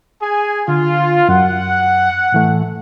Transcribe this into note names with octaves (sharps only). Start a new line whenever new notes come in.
G#4 G#5
D3 F4
F#2 F#5
A2 E3 A3